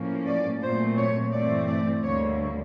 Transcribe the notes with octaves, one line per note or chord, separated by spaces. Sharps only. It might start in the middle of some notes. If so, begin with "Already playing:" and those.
Already playing: A2 F3 A#3 C#4
D5
A#2 F#3 A3 C4 C5
C#5
G2 E3 A3 C4 D5
D5
D2 D3 G3 A#3 C#5